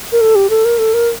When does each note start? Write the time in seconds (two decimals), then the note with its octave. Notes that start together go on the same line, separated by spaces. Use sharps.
0.12 A#4
0.21 A4
0.35 G4
0.50 A4
0.65 A#4
0.78 A4
0.94 A#4